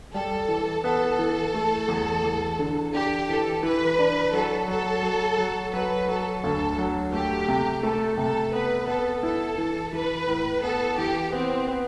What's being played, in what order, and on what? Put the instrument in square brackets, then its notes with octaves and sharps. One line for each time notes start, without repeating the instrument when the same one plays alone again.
[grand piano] G3 [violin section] A4
[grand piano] E3
[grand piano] B3 [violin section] A4
[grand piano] E3
A3
E2
E2
D3
[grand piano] D4 [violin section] G4
[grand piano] E3 [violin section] A4
[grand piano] E3 [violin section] B4
[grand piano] D4
[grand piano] F#3 [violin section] A4
[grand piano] F#3 [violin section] A4
[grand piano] F#3
F#3
[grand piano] F#3 [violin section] B4
[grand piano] F#3 [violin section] A4
[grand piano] D2 [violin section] A4
[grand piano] F#3
[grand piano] A3 [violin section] G4
[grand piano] C3
[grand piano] A3 [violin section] A4
[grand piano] C3 [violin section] A4
[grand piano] B3 [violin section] B4
[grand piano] B3 [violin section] A4
[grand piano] E4 [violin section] A4
[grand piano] E3
[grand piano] E3 [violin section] B4
[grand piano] A2
[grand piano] B3 [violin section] A4
[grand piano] E3 [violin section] G4
[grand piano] B3 [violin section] C4
[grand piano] B3